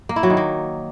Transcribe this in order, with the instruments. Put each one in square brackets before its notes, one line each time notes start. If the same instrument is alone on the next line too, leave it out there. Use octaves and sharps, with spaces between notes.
[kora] A#3
E4
F#3
D#3
A#3